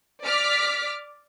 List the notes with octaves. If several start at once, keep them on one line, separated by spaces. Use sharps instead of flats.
D5 D6 F6 B6